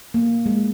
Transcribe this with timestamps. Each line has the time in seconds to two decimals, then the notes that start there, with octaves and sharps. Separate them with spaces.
0.14 A#3
0.46 G#3